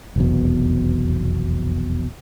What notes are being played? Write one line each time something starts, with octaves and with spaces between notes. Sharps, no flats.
F1 B1 E2 B2